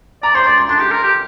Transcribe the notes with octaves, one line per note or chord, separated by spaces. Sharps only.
D5 A#5
C5 C6
D5 C6
C6
D4 C6
G4
A#4
G4